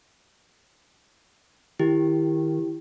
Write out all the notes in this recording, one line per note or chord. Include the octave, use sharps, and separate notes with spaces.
D#3 E4 G4